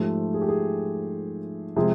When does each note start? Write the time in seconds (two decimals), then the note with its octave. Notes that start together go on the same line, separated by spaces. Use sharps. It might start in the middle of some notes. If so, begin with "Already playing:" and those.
Already playing: G#2 F3 A3 G4
0.34 G#4
0.42 G4
0.49 G#4
1.76 C3 F3 G#3 G#4